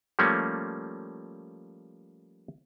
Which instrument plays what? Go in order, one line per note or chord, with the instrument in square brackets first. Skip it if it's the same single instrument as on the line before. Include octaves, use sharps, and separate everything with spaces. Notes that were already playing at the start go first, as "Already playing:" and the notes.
[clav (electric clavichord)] F3 G3 A3 A#3 C#4